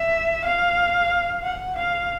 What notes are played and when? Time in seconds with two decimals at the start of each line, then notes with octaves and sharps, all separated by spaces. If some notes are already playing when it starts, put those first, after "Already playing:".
Already playing: E5
0.45 F5
1.43 F#5
1.76 F5